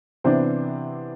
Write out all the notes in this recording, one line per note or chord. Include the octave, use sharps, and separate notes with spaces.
C3 E3 B3 C4 D4 C5